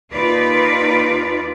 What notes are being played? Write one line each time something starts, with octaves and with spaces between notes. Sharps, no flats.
D#2 D#4 F4 B4 D5